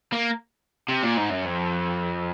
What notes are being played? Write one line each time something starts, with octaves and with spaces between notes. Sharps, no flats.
A#3
C3
A#2
G#2
F#2
F2